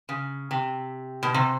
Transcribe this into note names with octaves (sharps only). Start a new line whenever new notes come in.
C#3
C3
B2
C3